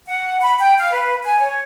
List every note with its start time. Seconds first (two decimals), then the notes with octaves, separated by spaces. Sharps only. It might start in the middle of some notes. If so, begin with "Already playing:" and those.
0.07 F#5
0.42 B5
0.59 G5
0.77 F5
0.94 B4
1.23 G#5
1.39 C#5